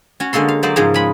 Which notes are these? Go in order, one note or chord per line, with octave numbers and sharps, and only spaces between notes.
C#4 F#4
D3 G#3 A#3 A4 C6
F5
F#3 A#3 C5 D5 D#5
G#2 C#3 F3 G#4 A#5
G#3 B5